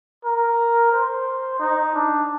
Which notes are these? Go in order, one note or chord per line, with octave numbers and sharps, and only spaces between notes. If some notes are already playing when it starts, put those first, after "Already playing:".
A#4
C5
D#4
D4